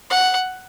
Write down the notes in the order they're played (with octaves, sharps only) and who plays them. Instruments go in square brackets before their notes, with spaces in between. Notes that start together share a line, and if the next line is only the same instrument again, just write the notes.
[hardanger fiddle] F#5